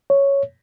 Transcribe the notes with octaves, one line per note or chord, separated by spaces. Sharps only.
C#5